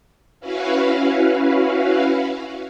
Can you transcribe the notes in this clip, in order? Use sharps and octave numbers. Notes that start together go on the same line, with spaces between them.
C#4 E4 F#4 B4 F5